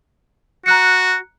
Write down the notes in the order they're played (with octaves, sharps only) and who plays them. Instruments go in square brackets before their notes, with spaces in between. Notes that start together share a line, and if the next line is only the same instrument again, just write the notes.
[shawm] F#4 [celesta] A#5 F#6 C#7